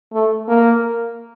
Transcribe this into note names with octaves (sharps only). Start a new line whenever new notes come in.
A3
A#3